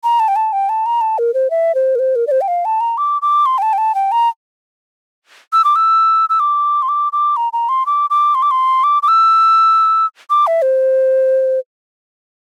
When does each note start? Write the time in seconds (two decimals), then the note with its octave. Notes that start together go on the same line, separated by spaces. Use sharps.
0.04 A#5
0.20 A5
0.28 G5
0.36 A5
0.53 G5
0.69 A5
0.86 A#5
1.01 A5
1.18 A#4
1.34 C5
1.50 E5
1.75 C5
1.95 A#4
1.99 C5
2.16 A#4
2.27 D5
2.31 C5
2.41 G5
2.48 F5
2.65 A5
2.81 A#5
2.98 D6
3.22 D6
3.46 C6
3.58 G5
3.62 A5
3.73 G5
3.78 A5
3.95 G5
4.12 A#5
5.53 E6
5.64 D6
5.76 E6
6.29 E6
6.40 D6
6.82 C6
6.89 D6
7.13 D6
7.37 A#5
7.53 A#5
7.69 C6
7.86 D6
8.10 D6
8.35 C6
8.42 D6
8.51 C6
8.84 D6
9.03 D6
9.08 E6
10.30 D6
10.47 E5
10.62 C5